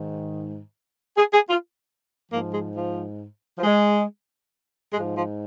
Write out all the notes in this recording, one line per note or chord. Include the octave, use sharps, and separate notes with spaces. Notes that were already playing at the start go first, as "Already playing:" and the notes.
Already playing: G#2 D#3
G#4
G#4
F4
G#2 F3 A#3
G#3
F3
F3
G#3
G#2 F3 G#3
F3